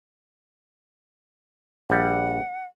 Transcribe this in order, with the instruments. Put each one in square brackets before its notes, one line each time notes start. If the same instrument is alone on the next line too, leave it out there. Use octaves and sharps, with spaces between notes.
[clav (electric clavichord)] A#1 G3 [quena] F#5